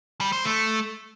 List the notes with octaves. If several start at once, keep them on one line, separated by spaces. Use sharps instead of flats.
G3
C5
A3